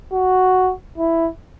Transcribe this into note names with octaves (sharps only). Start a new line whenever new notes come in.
F#4
E4